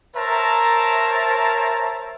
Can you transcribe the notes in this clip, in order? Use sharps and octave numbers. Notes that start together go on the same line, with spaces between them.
A#4 C5 C#5 E5 A5 A#5